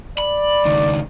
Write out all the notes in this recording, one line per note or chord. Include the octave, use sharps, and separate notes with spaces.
D5 B5
C#2 D#3